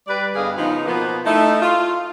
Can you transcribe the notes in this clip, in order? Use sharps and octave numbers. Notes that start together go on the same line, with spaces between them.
G3 B4 D5
G2 D3 B3 G#4 D#5 F5
C#3 F3 B3 D#4
B2 F3 A#3 B3
A3 D#4 E4
F4